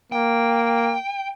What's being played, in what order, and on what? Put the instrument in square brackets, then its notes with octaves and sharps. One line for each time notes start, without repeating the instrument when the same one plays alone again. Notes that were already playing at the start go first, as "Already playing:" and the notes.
[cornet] A#3 [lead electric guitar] G5